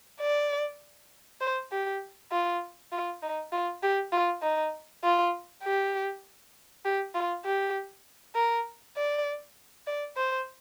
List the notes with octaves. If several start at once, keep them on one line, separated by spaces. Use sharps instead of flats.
D5
C5
G4
F4
F4
D#4
F4
G4
F4
D#4
F4
G4
G4
F4
G4
A#4
D5
D5
C5